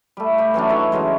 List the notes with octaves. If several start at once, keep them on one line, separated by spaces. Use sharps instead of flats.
G3 A3
G4 B5
E3 F#3 C#4 D4
D#4 E4 A4 C#5
C#3 E3 F#3 G#3